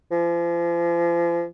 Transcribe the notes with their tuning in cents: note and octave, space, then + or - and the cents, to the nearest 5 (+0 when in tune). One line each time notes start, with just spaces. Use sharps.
F3 -40